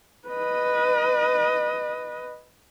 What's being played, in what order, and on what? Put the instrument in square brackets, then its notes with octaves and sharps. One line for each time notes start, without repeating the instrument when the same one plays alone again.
[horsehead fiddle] B4 D#5